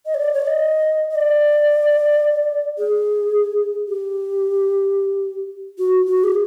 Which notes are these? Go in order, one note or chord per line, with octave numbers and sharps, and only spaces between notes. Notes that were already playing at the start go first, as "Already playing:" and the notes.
D#5
C#5
D5
C#5
D5
D#5
D#5
D5
G#4
G4
F#4
F#4
G#4